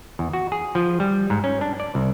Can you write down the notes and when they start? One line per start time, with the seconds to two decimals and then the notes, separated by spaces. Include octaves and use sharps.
0.19 E2
0.33 F#4
0.52 G#4
0.75 F3
1.00 G3
1.30 G#2
1.44 C#4
1.61 D4
1.80 D5
1.95 C2